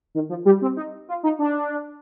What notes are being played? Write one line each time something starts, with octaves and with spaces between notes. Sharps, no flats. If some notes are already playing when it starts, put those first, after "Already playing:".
D#3
F3
G3
C4
D#4
F4
D#4
D4